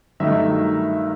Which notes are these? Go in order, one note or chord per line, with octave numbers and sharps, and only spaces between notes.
G2 D#3 F#3 A3 D#4 E5